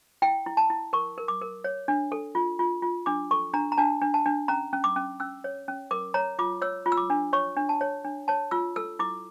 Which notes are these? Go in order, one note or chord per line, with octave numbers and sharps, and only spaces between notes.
E4 G5
E4
A5
E4
A#4 C#6
A#4
D6
A#4
C#5
D4
A4
F4
F4
F4
D4 D6
A4 C#6
D4 A#5
A#5
D4 A5
D4
A5
D4
C#4 A#5
C#4
D6
C#4
C#4 E6
C#5
C#4
A#4 D6
C#5 A#5
F4 D6
C#5 E6
F4
E6
D6
D4
C#5 C#6
D4
A5
C#5
D4
C#5 A5
F4 E6
A4 E6
E4 D6